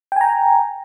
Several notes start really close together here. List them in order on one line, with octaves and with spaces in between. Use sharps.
G5 G#5 A#5